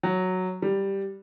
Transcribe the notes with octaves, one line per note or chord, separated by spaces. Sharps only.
F#3
G3